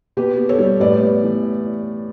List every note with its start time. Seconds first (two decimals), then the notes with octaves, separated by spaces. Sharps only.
0.17 B2 G4 B4
0.38 B3
0.49 A4 C#5
0.59 G3
0.80 A2 B4 D5
1.01 B3
1.23 E3